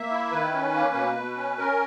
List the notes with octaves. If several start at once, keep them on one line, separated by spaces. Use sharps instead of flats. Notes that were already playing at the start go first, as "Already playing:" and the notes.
Already playing: A#3 E5
E4
D#3 B4
C#4
A#3
B2
B2
C#4
C#4 A#4